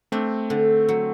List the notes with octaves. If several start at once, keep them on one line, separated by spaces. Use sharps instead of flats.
A3 C4 D4
D3
F#3